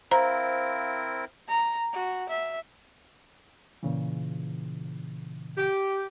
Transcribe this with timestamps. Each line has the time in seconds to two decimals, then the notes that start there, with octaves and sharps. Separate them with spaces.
0.11 C4 E4 A#4 C5 F5 A#5
1.49 A#5
1.93 F#4
2.29 E5
3.83 A#2 C#3 E3
5.58 G4